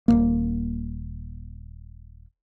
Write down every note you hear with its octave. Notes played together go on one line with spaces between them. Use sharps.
D#1 F2 A#3